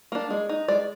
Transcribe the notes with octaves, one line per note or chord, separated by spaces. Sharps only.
A#3 D4
G#3
D#4
G#3 D5